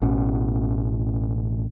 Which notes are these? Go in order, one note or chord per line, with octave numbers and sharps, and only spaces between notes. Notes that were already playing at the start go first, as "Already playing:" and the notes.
A1 B2 B3 C#4